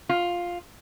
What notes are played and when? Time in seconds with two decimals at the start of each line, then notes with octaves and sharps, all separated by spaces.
0.09 F4